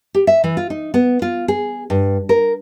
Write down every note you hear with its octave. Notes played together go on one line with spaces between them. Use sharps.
G4
E5
E3
F4
D#4
B3
F4
G#4
G2
A#4